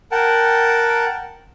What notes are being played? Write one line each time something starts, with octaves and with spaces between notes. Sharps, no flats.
A#4 F#5 G5 A5